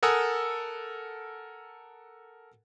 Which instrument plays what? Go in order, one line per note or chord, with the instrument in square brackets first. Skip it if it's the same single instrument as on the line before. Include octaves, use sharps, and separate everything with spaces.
[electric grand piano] A4 A#4 F#5 G#5 D#6 E6